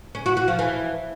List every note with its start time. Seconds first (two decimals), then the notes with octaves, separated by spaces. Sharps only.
0.15 C#4
0.26 F#4
0.37 F#4
0.48 F3
0.59 E3